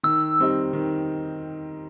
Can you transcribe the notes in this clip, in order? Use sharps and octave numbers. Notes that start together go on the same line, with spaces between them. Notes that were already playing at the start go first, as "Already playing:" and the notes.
D#3 E6
G3 C4 D#4
D#3